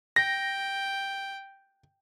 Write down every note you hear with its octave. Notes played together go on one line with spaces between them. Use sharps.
G5 A#6